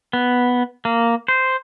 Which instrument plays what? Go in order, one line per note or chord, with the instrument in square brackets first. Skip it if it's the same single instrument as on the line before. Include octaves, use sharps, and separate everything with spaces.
[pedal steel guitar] B3
A#3
C5